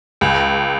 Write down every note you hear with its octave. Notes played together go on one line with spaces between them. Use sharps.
C#2